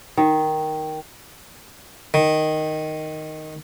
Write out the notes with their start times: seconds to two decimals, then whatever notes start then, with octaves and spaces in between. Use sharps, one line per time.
0.17 D#3
2.14 D#3